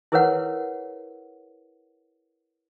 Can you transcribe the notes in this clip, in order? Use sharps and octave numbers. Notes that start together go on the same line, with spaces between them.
E4 G#4 A#4 B4 C#5 F#5